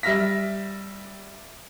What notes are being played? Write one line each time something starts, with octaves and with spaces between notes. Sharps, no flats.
G3 E5 F6 A#6 B6